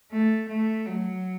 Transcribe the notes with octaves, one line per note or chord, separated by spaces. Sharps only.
A3
A3
F#3